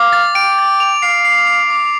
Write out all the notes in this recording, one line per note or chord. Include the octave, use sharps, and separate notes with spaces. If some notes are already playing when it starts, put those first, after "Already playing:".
Already playing: F5 D6
A6
G5 D7
A6
F7
F5 C7
C7
C7
D6